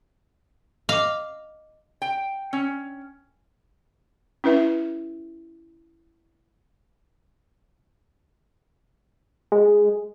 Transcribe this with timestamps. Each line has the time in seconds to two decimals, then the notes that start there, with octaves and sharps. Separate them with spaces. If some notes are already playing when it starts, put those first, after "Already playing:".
0.89 D#5 F5 D6
2.02 G5
2.53 C#4
4.44 C#4 E4 B4 E5
9.52 G#3